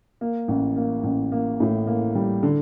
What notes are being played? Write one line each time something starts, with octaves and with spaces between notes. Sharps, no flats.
A#3
A1
A#3
A1
A#3
A2
A#3
G3
D3